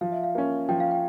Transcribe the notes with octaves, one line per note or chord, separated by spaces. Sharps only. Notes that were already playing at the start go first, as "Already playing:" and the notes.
F3 F5
E5
F5
A#3 C#4
F3 G5
F5
G5